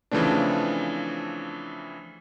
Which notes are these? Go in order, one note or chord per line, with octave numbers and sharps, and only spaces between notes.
C#3 E3 F3 A3 C4 D4